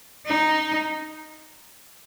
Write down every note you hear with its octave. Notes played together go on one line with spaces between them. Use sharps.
D#4